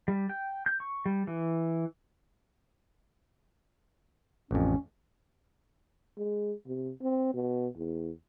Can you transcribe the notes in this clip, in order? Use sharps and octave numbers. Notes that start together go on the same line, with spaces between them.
G3
G5
G6
C#6
G3
E3
A1 F2 C#4
G#3
C3
C4
B2
E2